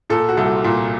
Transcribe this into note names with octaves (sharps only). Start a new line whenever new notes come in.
A#2 A4
F#4
C2 A4
A#2